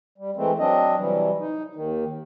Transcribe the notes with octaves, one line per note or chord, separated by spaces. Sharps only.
G3
E3 G#3 A3 C4
F#3 C4 D4 D#5
C3 E3 F#3 G3
D#4
D#2 D#3